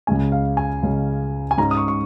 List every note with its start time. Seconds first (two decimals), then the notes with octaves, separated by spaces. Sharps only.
0.07 C#2 C#3 G#3 C#4 G#5
0.32 F5
0.57 G#5
0.82 C#2 C#3 G#3 C#4
1.51 G#5
1.58 G#2 G#3 C#4 A#5
1.71 D#6
1.77 C#6
1.88 C#6